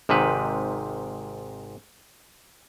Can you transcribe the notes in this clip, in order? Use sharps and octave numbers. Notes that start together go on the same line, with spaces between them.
G#1 G#2 C3 D#3 B4